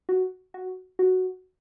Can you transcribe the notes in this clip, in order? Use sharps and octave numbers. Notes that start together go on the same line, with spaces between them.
F#4
F#4
F#4